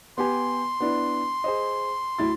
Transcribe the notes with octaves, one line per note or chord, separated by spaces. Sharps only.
B3 G4 G#5 C6
B3 D4 E4
G#4 C5 D#5
D2 E4 A6